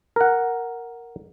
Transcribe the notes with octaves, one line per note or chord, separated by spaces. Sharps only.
A#4 F#5